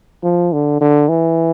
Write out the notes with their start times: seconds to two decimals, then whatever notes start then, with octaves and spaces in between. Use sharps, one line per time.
0.24 F3
0.53 D3
0.81 D3
1.09 E3